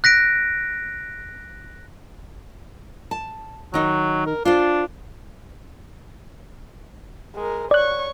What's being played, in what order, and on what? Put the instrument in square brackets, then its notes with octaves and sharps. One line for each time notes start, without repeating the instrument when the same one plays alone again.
[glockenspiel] F#6 A#6 B6 D7
[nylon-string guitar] A5
[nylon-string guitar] D#3 D#4 [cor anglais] F#3
[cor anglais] A#4
[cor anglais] D4 [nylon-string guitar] F4 C5
[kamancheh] G#3 A#4
[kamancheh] C#5 C#6 [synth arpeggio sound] D5 F#6